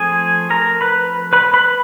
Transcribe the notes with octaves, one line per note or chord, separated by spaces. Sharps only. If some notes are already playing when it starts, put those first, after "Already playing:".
Already playing: F3 A3 C4 G#4 G#5
A#4 A#5
B4 B5
B4 B5
B4 B5